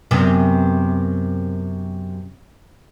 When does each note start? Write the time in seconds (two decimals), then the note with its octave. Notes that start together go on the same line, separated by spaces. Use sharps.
0.11 F#2 C3 B3